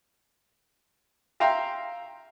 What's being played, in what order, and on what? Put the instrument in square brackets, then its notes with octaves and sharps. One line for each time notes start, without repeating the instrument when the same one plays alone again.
[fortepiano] E5 F5 G5 A#5 C6